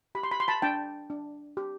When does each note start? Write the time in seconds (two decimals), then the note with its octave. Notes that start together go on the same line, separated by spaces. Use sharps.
0.15 G4 B5
0.23 C6
0.31 B5
0.40 C6
0.48 A5 B5
0.62 D4 G5 A5
1.10 D4
1.57 G4